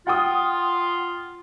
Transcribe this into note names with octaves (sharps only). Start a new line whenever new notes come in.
F4 F#5 G5 D#6